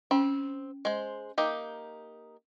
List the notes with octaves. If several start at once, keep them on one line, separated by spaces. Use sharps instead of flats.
C4 C#4
G#3 C5
A#3 D#4 G4